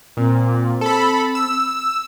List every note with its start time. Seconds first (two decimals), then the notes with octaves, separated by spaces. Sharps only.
0.17 A#2 C4
0.81 A4 B5
1.35 E6